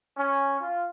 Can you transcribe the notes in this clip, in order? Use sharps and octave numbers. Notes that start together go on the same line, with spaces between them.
C#4
F4